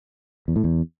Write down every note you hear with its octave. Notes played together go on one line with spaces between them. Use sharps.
E2
A2
E2